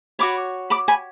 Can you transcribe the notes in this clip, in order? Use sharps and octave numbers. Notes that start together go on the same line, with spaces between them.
F#4 A4 C#5 B5 D6
B5 D6
G#5 B5